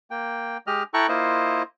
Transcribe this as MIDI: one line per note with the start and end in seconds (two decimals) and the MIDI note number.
0.11 0.57 58
0.11 0.57 79
0.67 0.83 56
0.67 0.83 67
0.67 0.83 75
0.67 0.83 89
0.94 1.07 64
0.94 1.07 69
0.94 1.07 79
0.94 1.07 82
0.94 1.07 85
0.94 1.07 90
1.09 1.62 58
1.09 1.62 64
1.09 1.62 65
1.09 1.62 72
1.09 1.62 75